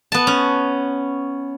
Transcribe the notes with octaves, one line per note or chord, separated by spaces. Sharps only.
B3 A5
C#4